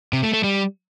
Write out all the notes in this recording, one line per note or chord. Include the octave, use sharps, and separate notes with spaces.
C3
A3
A3
G3